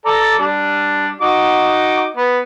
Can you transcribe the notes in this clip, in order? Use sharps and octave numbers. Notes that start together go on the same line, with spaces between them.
A4 D5 A#5
G3 D4
D#4 F#4 D6
B3